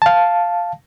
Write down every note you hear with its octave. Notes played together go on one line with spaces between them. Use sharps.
F5 A5